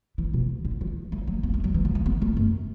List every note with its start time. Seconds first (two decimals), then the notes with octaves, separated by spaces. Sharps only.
0.18 E3
0.34 B2
0.65 D3
0.81 E3
1.12 A3
1.27 F#3
1.43 B3
1.54 A3
1.64 F#3
1.74 E3
1.85 F#3
1.95 A3
2.06 B3
2.22 A3
2.37 F#2